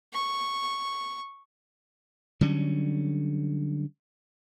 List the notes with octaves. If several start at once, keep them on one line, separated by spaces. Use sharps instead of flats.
C#6
D3 F#3 G3 C#4